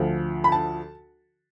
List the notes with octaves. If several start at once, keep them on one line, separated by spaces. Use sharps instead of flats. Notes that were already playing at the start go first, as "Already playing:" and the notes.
Already playing: D2 D3 F3
B5
A5